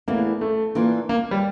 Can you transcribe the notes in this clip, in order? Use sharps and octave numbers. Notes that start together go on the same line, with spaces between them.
E2 E3 A3 A#3
A3
E3 A#3 D4 F4
A#3
G3